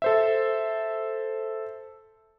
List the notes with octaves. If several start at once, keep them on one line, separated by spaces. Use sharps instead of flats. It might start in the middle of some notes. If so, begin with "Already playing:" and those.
A4 C5 E5